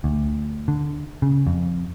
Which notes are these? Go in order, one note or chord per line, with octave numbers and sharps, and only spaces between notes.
D2
D3
C#3
F2